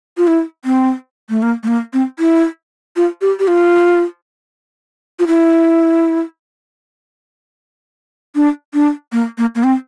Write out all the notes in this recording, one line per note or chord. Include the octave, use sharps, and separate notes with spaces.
F4
E4
C4
A3
A#3
A3
A#3
C4
E4
F4
G4
G4
F4
F4
E4
D4
D4
A#3
A#3
A#3
C4